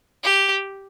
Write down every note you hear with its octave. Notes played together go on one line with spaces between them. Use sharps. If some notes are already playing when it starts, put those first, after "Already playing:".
G4